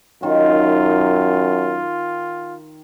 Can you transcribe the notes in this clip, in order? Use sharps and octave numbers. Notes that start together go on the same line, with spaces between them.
F#2 D#3 F4